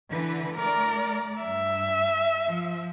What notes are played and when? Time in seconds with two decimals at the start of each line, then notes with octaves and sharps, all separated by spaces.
0.11 D3 E3 B4
0.57 A3 A#4 D5
1.42 G2 E5
2.45 F3